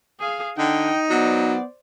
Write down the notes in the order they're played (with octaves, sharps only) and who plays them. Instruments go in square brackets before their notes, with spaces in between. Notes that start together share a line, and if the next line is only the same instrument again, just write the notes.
[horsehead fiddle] G#4 F5
[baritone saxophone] D3 [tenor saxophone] D#4 [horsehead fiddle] G5
[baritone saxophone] F#3 [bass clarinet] B3 [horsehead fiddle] C5 D5